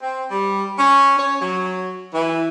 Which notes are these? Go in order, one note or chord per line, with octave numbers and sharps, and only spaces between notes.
C4
G3
C#4
C#5
F#3
E3